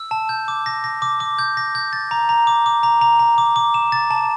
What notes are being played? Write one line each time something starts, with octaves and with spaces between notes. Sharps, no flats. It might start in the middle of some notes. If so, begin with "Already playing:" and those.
Already playing: E6
A5
G6
D6
A#6
A#6
D6
D6
G6
A#6
G6
A6
A#5
A#5
D6
D6
A#5
A#5
A#5
D6
D6
E7
A6
A5